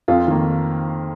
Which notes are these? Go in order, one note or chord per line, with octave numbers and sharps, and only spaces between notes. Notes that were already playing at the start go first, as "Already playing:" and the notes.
F2 F4
D#3 A#3